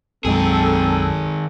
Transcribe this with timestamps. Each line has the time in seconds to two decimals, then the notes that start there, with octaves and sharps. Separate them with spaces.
0.25 B1 F#2 D#3 G#3 C4 G#4 A4